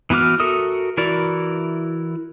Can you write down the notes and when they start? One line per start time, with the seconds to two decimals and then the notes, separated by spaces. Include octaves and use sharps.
0.10 E3 B3 F#4 D6 F6
0.40 F#4 A4 A#4 E5 D#6
0.97 E3 E4 F#4 A#4 D5